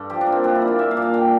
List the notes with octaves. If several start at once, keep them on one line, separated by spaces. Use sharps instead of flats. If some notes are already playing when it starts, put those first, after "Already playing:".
Already playing: G2 A4
F3 G4
D4
A#3
C4
A#2 D4
E4
A#3
F4
A#2 E5
F5
A#2
F5
A#2 G5